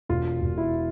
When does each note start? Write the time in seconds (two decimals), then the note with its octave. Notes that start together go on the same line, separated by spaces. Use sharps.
0.09 E1 F4
0.41 E1
0.58 E4